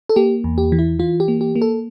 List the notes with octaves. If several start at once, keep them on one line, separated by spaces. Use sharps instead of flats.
A4
A#3 G4
E2
G4
E3
E4
E3 F4
G4
A#3
G4
A#3
A4